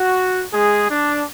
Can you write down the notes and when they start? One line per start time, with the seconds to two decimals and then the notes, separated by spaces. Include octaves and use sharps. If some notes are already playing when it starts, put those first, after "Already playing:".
Already playing: F#4
0.51 G#3 G#4
0.89 D4